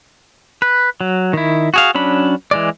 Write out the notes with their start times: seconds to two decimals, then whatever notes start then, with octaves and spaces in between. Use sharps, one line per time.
0.62 B4
1.01 F#3
1.33 D#3 E4
1.74 F#4 G#4 F5
1.95 F#3 C#4 D4 B5
2.51 E3 G#3 D5